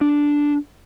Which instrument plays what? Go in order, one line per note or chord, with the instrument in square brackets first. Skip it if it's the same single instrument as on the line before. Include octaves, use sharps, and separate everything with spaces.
[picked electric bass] D4